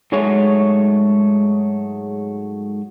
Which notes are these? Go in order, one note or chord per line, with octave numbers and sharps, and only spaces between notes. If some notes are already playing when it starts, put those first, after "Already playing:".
G#2 F#3 G#3 A3 C#5 G#5